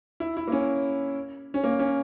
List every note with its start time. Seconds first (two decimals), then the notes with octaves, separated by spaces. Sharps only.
0.20 E4
0.37 E4
0.47 A#3
0.52 C#4
1.54 C#4
1.64 A#3
1.79 C#4